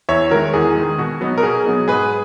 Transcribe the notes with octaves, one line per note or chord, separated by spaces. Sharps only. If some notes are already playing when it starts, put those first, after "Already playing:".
E2 C#5 E5
D#3 G#3 F#4 A#4
E2 G#4
D#3 G#3
B2 F#4
F#3 B3 D#4
A#4
B2 G#4
F#3 B3 D#4
G#2 G#4 B4